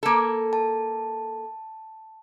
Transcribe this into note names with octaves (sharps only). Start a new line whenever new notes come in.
A#3 A4
A5